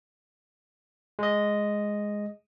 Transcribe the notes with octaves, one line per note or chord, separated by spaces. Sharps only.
G#3 D#5